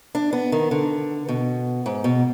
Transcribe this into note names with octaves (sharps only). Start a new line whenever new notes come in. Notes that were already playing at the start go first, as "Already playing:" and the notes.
D4
B3
D#3
D3
B2
G#2
B2